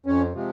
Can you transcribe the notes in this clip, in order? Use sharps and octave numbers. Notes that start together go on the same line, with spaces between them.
F2 C#4
C3 F3 G#3